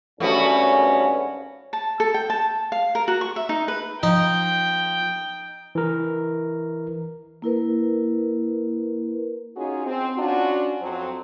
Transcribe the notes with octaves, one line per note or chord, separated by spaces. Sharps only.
G#1 G2 A3 B3 C#4 F#4
A5
A4
G5
A5
F5
A#4
F#4
C#6
E5
D#4
B4
F3 D#4 G5
E3 A#4
A#3 E4 A#4 B4
C#4 D#4 F4 F#4 G#4
C4
C#4 D4 F4 F#4
F2 F#3 C4 C5